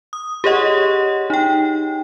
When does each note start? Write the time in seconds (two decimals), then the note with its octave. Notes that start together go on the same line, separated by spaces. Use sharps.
0.13 D#6
0.44 G4 G#4 C#5 D#5 F#5
1.30 D#4 G5